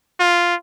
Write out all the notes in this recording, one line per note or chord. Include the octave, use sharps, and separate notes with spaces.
F4